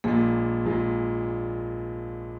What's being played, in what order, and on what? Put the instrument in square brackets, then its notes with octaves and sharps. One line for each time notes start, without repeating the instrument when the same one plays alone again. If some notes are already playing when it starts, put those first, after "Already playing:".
[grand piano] A#1 A#2 G#3 [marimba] A#3
[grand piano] A#1 A#2 G#3